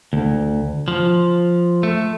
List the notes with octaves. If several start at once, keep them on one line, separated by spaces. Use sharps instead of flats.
D2
F3
A3